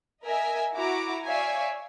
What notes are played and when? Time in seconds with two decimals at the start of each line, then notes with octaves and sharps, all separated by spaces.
0.24 A#4 D#5 E5 G#5
0.74 E4 F#4 A#5 D6
1.26 C#5 D5 E5 F5 G#5